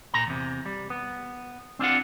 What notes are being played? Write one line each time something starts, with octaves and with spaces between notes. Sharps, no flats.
A#2 A#5
E2 C3
G3
B3
C4 D4 F4 F#5